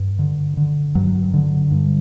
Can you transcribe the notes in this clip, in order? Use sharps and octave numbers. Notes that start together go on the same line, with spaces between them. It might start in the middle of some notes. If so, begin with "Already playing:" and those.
Already playing: G2
D3
D3
G2 F#3
D3
G2